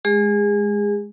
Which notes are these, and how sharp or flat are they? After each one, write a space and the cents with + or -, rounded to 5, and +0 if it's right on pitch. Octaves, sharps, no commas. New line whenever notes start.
G#3 +5 G#4 -30